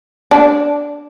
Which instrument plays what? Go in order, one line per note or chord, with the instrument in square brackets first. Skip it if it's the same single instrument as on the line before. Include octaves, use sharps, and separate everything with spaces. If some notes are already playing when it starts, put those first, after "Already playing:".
[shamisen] D4